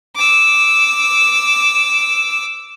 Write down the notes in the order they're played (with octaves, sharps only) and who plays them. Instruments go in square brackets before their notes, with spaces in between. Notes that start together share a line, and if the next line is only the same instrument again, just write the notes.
[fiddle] D6 E6